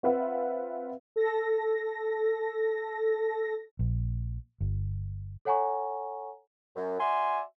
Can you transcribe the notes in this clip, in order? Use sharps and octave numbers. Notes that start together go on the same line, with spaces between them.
C4 F4 B4 E5 F#5
A4 A#6
A#1
G1
A4 C#5 F#5 G#5 A#5 C#6
F#2
F#4 D5 E5 G#5 C6